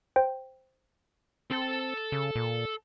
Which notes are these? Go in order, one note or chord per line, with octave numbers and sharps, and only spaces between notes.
C5 G5
C4 A4 A5
C#3
A#2